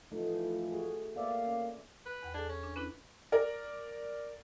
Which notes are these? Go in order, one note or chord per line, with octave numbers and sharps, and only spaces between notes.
A2 E3 F3 A3 D#4
A3 F#4 G#4
A#3 B3 D5 E5 F5
C#4
B4
E2 F#5 G5
D4 G#4 A4 G#5
C#4
D4
C#4 D4 E4 B4
A#4 D5